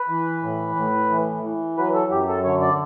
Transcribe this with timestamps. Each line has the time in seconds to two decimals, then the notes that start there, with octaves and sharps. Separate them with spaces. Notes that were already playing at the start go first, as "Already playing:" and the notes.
Already playing: B4
0.09 E3
0.43 A2
0.76 A2
1.10 E3
1.43 E3
1.77 F#3 B4
1.94 A4
2.11 F#2 G4
2.28 A4
2.44 D3 C#5
2.61 D5